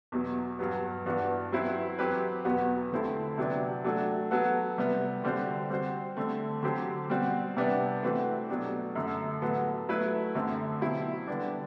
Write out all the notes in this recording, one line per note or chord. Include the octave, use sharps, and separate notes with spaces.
E2 B2 F#3
G2 F#3 B3
G2 E3 B3 D4 F#4
F#3 C4 E4 B4
F#3 C4 G4 B4
E2 B2 F#3 B3 F#4
D3 A3 C4 E4 A4
C3 F#3 B3 D4
F#3 A3 D4 F#4 A4
F#3 B3 F#4 A4
C3 G3 B3
D3 G3 C4 F#4 C5
G3 C4 F#4 C5
D3 A3 C4
D3 F#3 C4 G4 C5
B2 G3 C4 F#4
C3 G3 B3 D4
E3 A3 C4 F#4 B4
B2 F#3 A3 D4 G4
F#2 D3 A3
A2 F#3 B3 F#4 A4
F#3 A3 E4 B4
F#2 D3 A3 C4
B2 F#3 C4 E4
D3 G3 B3 D4